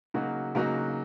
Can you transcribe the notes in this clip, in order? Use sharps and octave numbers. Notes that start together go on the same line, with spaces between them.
C#3 F#3 A#3 D#4 F#4
C#3 F#3 A#3 D#4 F#4